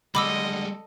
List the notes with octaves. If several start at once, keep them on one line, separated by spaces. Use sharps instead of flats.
D3 G3 G#3 D#5 B5 D6 E6